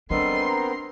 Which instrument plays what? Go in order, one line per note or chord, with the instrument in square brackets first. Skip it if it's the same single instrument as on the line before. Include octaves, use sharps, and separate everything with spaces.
[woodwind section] G3 A4 D#5 [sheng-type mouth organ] B3 C4 A#4 [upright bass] D4 [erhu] C6
[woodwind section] A#5